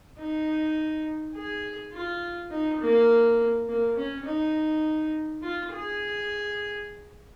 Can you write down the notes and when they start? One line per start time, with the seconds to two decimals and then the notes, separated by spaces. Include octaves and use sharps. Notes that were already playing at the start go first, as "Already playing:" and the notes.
0.19 D#4
1.35 G#4
1.93 F4
2.51 D#4
2.81 A#3
3.68 A#3
3.97 C#4
4.26 D#4
5.42 F4
5.72 G#4